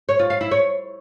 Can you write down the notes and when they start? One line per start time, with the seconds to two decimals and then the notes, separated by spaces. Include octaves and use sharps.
0.09 C#5
0.19 F4
0.30 F5
0.41 E4
0.51 C#5